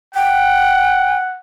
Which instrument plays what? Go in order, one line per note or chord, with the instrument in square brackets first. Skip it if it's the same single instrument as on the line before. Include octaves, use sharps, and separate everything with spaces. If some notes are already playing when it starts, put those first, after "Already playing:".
[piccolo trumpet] F#5 [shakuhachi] G5